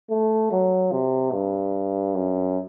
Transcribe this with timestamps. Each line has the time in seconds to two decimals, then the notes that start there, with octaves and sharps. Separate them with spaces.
0.10 A3
0.52 F#3
0.92 C3
1.33 G2
2.15 F#2